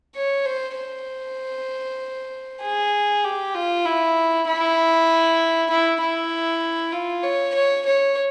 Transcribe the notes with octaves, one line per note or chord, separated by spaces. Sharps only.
C#5
C5
C5
G#4
G4
F4
E4
E4
E4
E4
F4
C#5
C#5
C#5